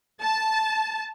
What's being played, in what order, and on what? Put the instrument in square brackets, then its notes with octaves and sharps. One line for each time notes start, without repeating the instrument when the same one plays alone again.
[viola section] A5